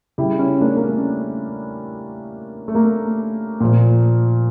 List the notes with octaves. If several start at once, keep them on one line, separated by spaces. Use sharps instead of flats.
C#3 G3 E4 G4
C#4 E4
A#3 D4
A#3
A3 C#4
A3
A#3
A#2 F3